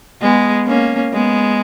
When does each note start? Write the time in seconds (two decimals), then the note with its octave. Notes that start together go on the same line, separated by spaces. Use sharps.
0.21 G#3 B3
0.67 A#3 C#4
1.13 G#3 B3